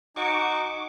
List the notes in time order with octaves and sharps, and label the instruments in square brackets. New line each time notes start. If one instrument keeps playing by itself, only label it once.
[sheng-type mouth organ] D#4 [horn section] F#4 G#5 [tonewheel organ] C#6 D6